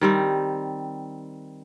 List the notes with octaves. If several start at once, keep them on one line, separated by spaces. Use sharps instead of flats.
D#3 G3 C4